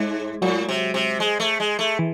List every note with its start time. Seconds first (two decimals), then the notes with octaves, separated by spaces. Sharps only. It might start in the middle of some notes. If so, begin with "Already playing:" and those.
Already playing: G#2 G#3
0.42 A2 F#3
0.68 C3
0.94 C3
1.20 G#3
1.40 A3
1.60 G#3
1.79 A3
1.99 E3